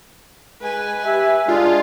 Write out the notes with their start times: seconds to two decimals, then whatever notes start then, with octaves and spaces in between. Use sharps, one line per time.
0.61 G#3 B4 G#5
1.05 G4 E5
1.48 G#3 D4 F4